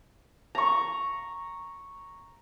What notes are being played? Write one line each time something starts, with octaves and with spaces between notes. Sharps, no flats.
A#5 C#6